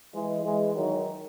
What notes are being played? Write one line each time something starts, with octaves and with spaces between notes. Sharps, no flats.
E3 G#3
E3 G#3
D#3 F#3